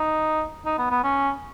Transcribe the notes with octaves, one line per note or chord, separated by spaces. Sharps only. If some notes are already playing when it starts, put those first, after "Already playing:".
Already playing: D#4
D#4
B3
B3
C#4